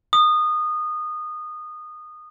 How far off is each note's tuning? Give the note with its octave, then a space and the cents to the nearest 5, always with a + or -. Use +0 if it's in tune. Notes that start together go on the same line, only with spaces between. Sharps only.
D#6 -20